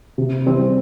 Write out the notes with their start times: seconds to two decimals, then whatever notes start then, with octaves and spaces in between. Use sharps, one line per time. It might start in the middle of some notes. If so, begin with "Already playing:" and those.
0.18 C3
0.46 E3 G3 C4